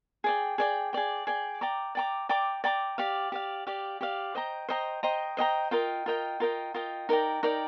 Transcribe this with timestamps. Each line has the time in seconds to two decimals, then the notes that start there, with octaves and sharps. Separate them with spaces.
0.24 G#4 D5 G5
0.58 G#4 D5 G5
0.93 G#4 D5 G5
1.27 G#4 D5 G5
1.61 D5 G5 A#5 D6
1.95 D5 G5 A#5 D6
2.29 D5 G5 A#5 D6
2.64 D5 G5 A#5 D6
2.98 G4 D5 F5
3.32 G4 D5 F5
3.67 G4 D5 F5
4.01 G4 D5 F5
4.35 C5 D#5 G5 A#5
4.69 C5 D#5 G5 A#5
5.03 C5 D#5 G5 A#5
5.37 C5 D#5 G5 A#5
5.71 F4 A#4 D#5 G5
6.06 F4 A#4 D#5 G5
6.40 F4 A#4 D#5 G5
6.74 F4 A#4 D#5 G5
7.09 D#4 A#4 D5 G5
7.43 D#4 A#4 D5 G5